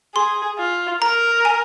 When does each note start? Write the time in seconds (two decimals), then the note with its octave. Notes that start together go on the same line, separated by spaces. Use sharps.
0.15 G#4 C6
0.58 F4
1.02 A#4 A#5
1.45 G#5